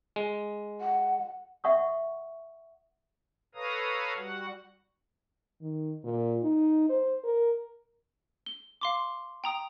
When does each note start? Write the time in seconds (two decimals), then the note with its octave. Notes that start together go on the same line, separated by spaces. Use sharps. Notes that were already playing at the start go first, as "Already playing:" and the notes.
0.16 G#3
0.81 F#5
1.64 E5 F#5 C#6 D#6
3.55 A4 B4 C#5 F5 A#5 D#6
4.17 G3 F#4 F#5
5.61 D#3
6.04 A#2
6.43 D#4
6.90 C5
7.24 A#4
8.46 G7
8.81 F5 C6 D6
9.44 G5 A#5 D#6